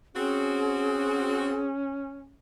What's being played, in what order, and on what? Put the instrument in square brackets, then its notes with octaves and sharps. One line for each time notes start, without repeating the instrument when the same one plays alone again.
[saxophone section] C4 F#4 [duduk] C#4 [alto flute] G#4